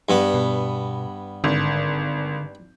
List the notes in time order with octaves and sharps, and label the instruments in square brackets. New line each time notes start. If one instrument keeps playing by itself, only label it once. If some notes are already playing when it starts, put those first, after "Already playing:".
[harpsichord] G2 B3
[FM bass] B2
[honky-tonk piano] G#1 [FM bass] D3